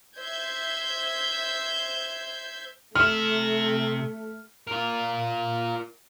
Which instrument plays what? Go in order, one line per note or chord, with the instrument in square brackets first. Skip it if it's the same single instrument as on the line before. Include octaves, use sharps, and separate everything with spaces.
[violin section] C5 E5 G6 G#6
[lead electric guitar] C3 E5 [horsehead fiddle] A3 [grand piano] F6
[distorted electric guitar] F4 A#4